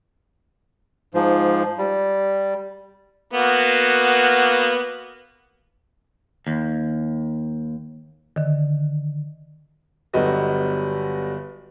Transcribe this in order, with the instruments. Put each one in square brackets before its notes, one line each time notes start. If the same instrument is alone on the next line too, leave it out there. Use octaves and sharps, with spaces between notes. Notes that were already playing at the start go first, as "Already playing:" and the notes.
[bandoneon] G#2 F3
G3
[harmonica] A#3 B3 F#4
[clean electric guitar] D#2
[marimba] D3 D#3
[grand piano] G1 F#3 G3 B3 D#5